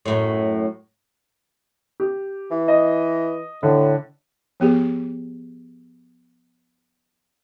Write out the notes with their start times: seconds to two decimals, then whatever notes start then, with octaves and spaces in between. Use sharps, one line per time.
0.06 F#2 A2
2.00 G4
2.51 E3
2.68 D#5
3.63 A2 D3
4.60 F3 B3 G4 G#4